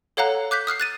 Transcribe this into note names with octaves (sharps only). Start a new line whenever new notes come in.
A4 C#5 F5 F#5 A#5 F#6
D6 F#6 G6 B6
D#6 F6 F#6 C7
F#6 A6 D#7